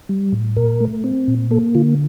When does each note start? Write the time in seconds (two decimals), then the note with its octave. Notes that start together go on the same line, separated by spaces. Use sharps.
0.09 G3
0.32 A2
0.57 A#2 A#4
0.80 A3
1.04 C4
1.28 A#2
1.51 A#3 A4
1.75 D3 F4